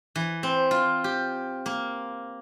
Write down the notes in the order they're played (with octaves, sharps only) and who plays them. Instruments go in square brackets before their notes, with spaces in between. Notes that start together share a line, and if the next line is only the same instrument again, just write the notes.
[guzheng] E3
C4
F4
G4
A#3